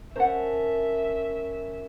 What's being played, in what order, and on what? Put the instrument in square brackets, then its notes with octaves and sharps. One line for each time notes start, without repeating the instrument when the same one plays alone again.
[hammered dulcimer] C#4 A#4 A5 [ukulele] C5 F#5 [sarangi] E5